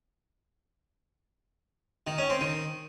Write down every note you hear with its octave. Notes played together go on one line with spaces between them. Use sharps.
D#3
C#4
C4
D#3